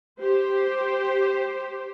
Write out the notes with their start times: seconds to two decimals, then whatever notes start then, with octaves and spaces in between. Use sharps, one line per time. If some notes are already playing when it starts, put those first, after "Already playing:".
0.20 G4 C5